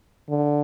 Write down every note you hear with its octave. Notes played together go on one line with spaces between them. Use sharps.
D3